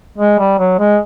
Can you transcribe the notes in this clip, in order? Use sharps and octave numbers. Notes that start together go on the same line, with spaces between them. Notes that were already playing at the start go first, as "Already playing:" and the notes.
G#3
G3
F#3
G#3